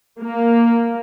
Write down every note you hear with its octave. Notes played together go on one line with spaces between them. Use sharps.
A#3